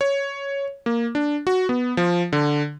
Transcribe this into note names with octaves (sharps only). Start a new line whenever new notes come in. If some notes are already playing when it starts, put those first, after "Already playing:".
C#5
A#3
D4
F#4
B3
F3
D3